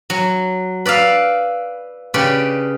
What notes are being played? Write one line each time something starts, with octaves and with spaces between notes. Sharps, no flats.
F#3
B4 D5 E5 F5
C#3 G4 B4 D5